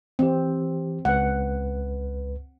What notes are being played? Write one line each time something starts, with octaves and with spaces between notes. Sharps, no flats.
E3 C4 G4
C#2 B4 F#5